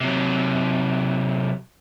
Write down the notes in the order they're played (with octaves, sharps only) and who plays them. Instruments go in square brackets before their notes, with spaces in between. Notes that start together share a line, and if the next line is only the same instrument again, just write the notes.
[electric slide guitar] C3 F#3